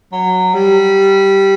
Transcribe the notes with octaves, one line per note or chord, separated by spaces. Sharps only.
F#3
G3